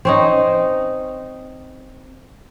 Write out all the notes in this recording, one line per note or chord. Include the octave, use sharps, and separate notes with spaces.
C4 C#4 D#4